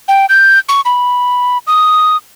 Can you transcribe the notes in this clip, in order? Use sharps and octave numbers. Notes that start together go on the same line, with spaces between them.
G5
G6
C#6
B5
D#6